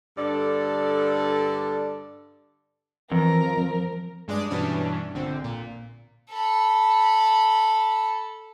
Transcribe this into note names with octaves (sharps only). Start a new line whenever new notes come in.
G2 D3 D4 A4 D5
F2 E3 A#4
F3
G2 G#3 D4 D5 D#6
G2 B2 E3 C#4 D4
A#1 D3 C4
A#2
A4 B5